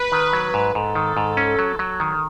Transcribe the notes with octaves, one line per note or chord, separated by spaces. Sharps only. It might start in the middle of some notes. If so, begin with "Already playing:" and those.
Already playing: B4
D#3
F#3
G#2
G#2 A4
D#3
G#2
C#4
F#3
F#3
D#3